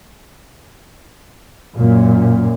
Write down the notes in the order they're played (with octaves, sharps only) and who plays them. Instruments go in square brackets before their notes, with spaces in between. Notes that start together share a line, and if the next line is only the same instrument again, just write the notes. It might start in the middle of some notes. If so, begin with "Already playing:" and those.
[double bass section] F#2 A#2